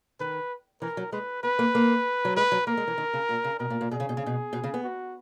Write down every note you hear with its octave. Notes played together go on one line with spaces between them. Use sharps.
D#3 B4
E3 A#4
F#3
G#3 B4
B3 B4
A#3
A#3
F#3
G#3 B4
F#3
A#3 A#4
G#3
E3
D#3
C#3
A#2
C#3
B2 A#4
A#2
A#2
B2 G#4
C#3
B2
C#3
B2
B2
C#3
B3
F#4